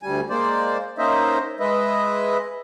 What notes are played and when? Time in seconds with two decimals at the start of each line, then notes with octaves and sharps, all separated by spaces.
0.03 D2 G3 G#5
0.30 G#3 A#3 C5 D5
0.98 A#3 C#4 D#4 C5 D#5 E5
1.60 G#3 B4 D#5 E5